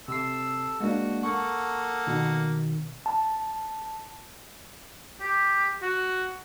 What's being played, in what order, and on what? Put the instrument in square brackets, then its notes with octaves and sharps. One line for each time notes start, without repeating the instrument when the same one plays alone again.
[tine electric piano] C3 C7 [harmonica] A4 E6
[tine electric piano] G#3 A#3 D4 [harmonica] F#4
[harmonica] A#3 A4 F#5 [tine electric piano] C#6
[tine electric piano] B2 D#3
A5
[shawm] G4
F#4